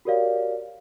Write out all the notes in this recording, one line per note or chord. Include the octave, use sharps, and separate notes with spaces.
F#4 G4 A#4 C#5 D5 F5